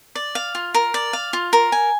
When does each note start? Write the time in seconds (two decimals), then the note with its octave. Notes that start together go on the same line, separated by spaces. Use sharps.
0.15 D5
0.35 F5
0.55 F4
0.74 A#4
0.94 D5
1.13 F5
1.33 F4
1.53 A#4
1.72 G#5